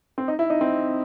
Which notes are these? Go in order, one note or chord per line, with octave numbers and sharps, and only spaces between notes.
C4
D#4
E4
D#4
C4